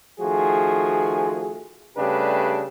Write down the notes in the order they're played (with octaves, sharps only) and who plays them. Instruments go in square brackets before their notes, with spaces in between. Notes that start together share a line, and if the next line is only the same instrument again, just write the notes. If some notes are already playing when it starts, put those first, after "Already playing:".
[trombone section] D#3 F3 A3 F#4 G#4
C#3 G3 A3 D4 G4 B4